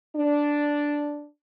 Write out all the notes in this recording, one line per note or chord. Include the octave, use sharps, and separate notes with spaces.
D4